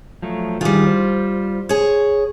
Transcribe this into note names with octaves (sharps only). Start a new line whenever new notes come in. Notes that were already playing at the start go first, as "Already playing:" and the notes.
F3 F#3 A3
D#3 E3 G3 F4 G#4
C5
G#4 C#5